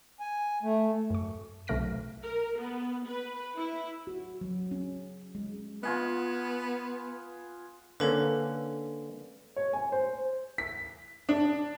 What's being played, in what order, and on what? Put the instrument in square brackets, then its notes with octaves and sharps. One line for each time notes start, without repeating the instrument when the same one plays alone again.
[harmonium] G#5
A3
[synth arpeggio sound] F#2 C#6
B1 C3 A3 F6 A#6 D7
[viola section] A#4
B3
B4
E4
[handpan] F#4
F#3
C#4
G#3
[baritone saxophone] B3 [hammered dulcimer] F4 G#4 F#5
[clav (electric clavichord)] D3 A#3 C#4 [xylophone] A4 B4
[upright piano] C#5
G#5
C5
[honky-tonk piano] B6
D4